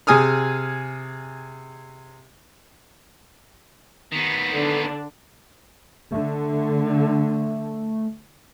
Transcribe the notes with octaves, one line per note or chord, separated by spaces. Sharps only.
C3 G#4 G#5 D#6 F6
D#3 B3
D3 D4
D3 A3